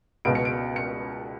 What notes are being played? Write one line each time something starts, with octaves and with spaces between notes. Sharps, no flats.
C#2 B2 D7
C#7
D7
C#7